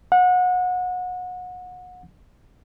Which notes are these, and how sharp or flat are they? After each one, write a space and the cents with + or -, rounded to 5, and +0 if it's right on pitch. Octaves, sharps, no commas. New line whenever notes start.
F#5 -30